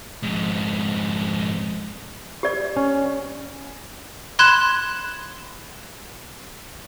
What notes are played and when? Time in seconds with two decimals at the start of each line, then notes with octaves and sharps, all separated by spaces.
0.23 F2 G#2
2.43 G4 D5
2.76 C#4
4.39 B5 C6 F#6 G#6 E7